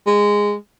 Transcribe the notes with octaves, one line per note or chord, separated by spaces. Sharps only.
G#3